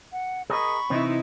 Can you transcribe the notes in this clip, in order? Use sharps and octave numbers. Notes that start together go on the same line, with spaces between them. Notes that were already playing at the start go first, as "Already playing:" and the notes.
F#5
G#4 A#4 D#5 B5 C#6
C3 E3 C4 D#4 E4